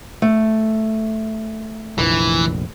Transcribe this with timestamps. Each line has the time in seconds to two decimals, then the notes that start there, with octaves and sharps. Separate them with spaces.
0.22 A3
1.98 F1 A#1 E3